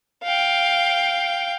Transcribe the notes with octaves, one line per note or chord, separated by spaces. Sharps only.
F5 G5